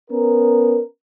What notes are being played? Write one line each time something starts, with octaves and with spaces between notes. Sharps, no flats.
B3 C#4 A#4